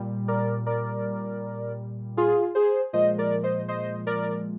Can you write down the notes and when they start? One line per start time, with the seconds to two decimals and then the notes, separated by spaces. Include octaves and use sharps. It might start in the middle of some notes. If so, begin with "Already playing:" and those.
Already playing: A#2 G3
0.28 A#4 D5
0.66 A#4 D5
2.17 F4 G#4
2.55 G#4 C5
2.93 A#2 F3 G#3 C5 D#5
3.18 A#4 D5
3.44 C5 D#5
3.68 C5 D#5
4.07 A#4 D5